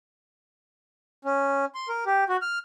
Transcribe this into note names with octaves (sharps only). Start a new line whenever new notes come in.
C#4
C6
A#4
G4
F#4
F6